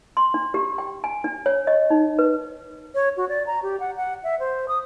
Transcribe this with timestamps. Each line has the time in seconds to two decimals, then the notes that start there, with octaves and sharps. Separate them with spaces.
0.17 C6
0.34 D4
0.54 G4
0.78 G5
1.04 G#5
1.24 D4
1.46 C#5
1.67 D#5
1.90 D#4
2.19 B4
2.95 C#5
3.17 F#4
3.29 D5
3.47 A#5
3.63 G4
3.80 F#5
3.97 F#5
4.24 E5
4.40 C5
4.68 D#6